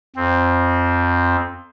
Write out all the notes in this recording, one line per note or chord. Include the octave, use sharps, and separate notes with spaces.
F2 C4